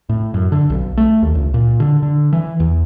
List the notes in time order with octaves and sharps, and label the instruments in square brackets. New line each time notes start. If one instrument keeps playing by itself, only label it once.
[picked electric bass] A2
F#2
D3
B1
A3
D#2
C#2
A#2
D3
D3
E3
E2